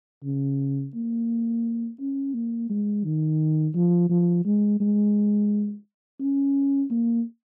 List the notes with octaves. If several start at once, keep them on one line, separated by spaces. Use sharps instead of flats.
C#3
A#3
C#4
A#3
G#3
D#3
F3
F3
G#3
G#3
C#4
A#3